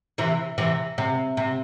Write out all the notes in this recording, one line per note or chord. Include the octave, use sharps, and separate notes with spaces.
C3 E3
C3 E3
C3
C3